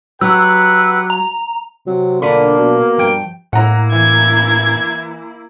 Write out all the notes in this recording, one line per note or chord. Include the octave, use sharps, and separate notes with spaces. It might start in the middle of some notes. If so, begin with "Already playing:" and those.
F#3 G4 B4 F#5 E6
A#5
C3 F#3
B1 D3 A#3 D4 F4 B5
B2
G2 F3 G5
A2 A#3 E4 F#5 A#5
E3 G#6